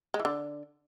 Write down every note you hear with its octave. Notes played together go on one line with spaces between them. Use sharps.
G#3
E3
D3